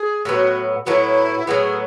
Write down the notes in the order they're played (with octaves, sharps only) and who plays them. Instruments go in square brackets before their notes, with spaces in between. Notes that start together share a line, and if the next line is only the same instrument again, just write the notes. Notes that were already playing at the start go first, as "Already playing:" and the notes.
Already playing: [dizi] G#4
[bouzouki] A2 F#3 B3 [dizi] F#4 G#4
[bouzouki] A2 F#3 B3 [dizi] E4 F#4
[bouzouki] A2 F#3 B3 [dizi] G#4